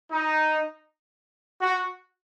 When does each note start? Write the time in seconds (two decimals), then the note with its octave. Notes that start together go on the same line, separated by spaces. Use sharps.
0.11 D#4
1.62 F#4